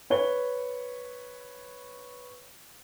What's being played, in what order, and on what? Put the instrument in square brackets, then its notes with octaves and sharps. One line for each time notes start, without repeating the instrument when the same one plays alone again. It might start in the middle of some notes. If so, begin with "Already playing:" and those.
[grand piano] B4 C#5 G7